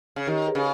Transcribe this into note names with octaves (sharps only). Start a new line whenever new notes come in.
C#3
D#3 G4 A#4
G#4 B4
C#3